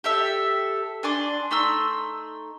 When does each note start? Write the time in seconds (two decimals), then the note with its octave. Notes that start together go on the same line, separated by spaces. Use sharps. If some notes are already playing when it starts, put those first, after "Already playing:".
0.04 G4 A4 E5
1.03 D4 G#5 C6 D6
1.51 A3 D#4 C6 E6